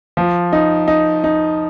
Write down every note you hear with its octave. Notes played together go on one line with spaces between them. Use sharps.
F3
D#4
D#4
D#4